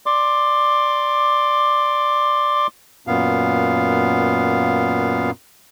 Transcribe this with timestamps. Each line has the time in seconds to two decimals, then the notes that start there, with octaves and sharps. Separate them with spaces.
0.06 D5 C6 D6
3.07 F#2 A#2 B3 F5